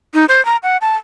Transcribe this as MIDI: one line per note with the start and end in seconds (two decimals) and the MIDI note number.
0.14 0.25 63
0.29 0.44 72
0.45 0.56 82
0.63 0.77 78
0.81 0.96 81